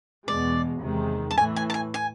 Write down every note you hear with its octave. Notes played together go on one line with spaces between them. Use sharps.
E2 B2 G#3 D5
E2 C3 D#3 G#3
A5
A2 E3 A3 G#5
G#5
A5
G#5
G#5